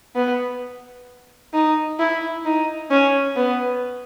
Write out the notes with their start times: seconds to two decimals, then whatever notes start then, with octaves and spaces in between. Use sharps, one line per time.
0.16 B3
1.53 D#4
1.99 E4
2.45 D#4
2.91 C#4
3.36 B3